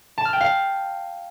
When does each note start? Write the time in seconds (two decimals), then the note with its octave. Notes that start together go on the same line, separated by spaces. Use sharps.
0.18 A5
0.25 F6
0.33 G5
0.41 F5